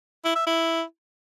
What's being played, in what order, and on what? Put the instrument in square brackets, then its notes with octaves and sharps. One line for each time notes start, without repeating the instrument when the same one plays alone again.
[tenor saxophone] E4
E5
E4